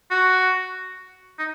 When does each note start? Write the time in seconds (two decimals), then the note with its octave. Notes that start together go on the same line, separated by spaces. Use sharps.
0.11 F#4
1.39 D#4